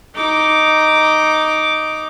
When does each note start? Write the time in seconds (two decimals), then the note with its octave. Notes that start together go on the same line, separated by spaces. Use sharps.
0.15 D#4 D6